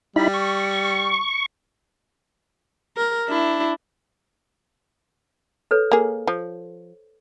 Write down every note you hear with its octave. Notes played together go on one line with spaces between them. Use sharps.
G3 D#4 E4 B5
C#6
A#4
D4 E4
A4 B4 C#5
A#3 G#4
F3